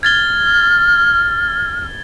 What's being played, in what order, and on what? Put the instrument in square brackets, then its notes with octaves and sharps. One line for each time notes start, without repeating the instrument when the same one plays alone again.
[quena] F6 [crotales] G#6 A6 G7